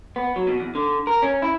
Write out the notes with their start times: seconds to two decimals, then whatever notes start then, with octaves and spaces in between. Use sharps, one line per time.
0.16 B3
0.36 F#3
0.47 B2
0.59 E2
0.75 D3
1.07 A#4
1.22 C#4
1.42 E4